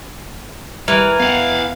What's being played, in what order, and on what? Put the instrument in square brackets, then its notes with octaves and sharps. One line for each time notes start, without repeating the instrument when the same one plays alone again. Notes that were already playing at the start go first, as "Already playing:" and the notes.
[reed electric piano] D#2 G3 F#6 [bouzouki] E3 [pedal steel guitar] A#4
[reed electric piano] E2 B3 [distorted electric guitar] F5 F#5